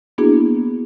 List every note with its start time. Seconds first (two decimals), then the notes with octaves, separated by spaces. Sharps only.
0.18 A#3 B3 D4 E4 F#4 G#4